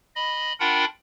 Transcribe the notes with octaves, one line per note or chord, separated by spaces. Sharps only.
D#5 B5
D4 F4 A#4 F#5 G5 B5